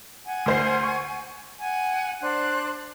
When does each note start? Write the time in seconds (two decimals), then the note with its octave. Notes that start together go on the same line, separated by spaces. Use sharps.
0.25 F#5 G#5
0.46 D2 C5 C7
0.83 C#6
1.59 F#5 G#5
2.21 D4 C5 F#6